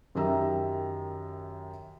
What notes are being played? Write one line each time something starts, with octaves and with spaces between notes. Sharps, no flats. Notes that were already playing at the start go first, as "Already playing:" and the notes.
F#2 D#3 G4 E5 A#5 E6